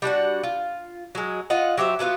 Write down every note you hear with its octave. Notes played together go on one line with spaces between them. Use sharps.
G3 D4 F#4 F#5
F4
F#3 G#3
F4 D#5 F#5
F#3 G4 C5 E5
F#3 A3 B3 F4